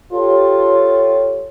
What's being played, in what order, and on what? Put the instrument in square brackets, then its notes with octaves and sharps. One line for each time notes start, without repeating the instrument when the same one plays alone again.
[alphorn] F4 [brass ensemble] G4 A4 C#5